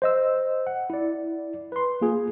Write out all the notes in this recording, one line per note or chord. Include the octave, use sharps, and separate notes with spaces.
C5 D#5 E6
F#5
E4 D5
B4 C6
A#3 F4 G#4